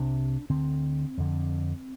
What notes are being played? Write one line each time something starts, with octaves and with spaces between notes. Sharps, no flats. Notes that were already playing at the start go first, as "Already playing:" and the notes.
Already playing: C2 C3 D4
D2 D3 C4
F2 D3